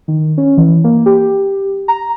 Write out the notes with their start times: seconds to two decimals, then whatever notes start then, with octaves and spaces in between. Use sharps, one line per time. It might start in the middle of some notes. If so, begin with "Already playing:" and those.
0.08 D#3
0.38 C#4
0.57 E3
0.84 A#3
1.06 G4
1.88 A#5